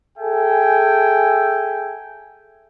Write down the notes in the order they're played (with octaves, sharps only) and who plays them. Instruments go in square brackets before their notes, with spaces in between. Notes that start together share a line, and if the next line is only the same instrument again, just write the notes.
[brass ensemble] G#4 A4 E5 G5 G#5